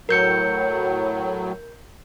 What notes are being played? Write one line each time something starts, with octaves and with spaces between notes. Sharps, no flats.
A2 F#3 A#4 G6 C#7